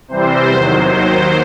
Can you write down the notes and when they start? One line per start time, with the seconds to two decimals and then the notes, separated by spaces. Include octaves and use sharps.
0.08 C3 E3 G3 C4 C5
0.49 E2 C3 D#3 F#3
0.88 D#2 D#3 F#3 C5